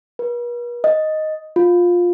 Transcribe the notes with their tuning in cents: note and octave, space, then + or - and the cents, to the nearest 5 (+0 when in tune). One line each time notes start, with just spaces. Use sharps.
B4 -45
D#5 +0
F4 +15